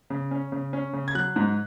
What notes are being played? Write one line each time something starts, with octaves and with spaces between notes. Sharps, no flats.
C#3
C#4
C#3
C#4
C#3
G#6
F#3 F#6
G#2